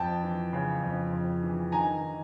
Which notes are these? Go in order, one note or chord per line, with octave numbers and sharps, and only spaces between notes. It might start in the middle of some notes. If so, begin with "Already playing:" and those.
Already playing: F2 G5 A5
E3
C#3
F2
F2
E3
D#3 G#5 A#5
D#3